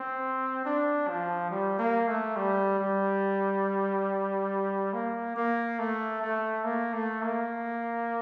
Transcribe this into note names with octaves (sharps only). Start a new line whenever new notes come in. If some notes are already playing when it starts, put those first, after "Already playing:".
Already playing: C4
D4
F3
G3
A#3
A3
G3
G3
A#3
A#3
A3
A3
A#3
A3
A#3